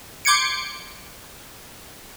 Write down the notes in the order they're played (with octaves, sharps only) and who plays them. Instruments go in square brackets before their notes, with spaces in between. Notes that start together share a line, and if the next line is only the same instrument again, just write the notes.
[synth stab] C6 D6 G6 G#6 C#7 D7